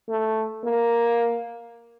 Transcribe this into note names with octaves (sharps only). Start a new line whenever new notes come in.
A3
A#3